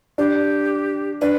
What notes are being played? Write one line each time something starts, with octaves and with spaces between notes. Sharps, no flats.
D4 G4
D4 B4